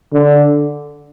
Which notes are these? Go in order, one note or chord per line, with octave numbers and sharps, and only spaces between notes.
D3